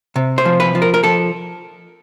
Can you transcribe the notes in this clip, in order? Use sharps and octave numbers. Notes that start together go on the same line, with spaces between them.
C3
C5
F3
B4
F3
A#4
A#4
F3 A4